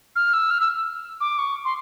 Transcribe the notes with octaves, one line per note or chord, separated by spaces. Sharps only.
F6
E6
F6
E6
D6
C#6
C6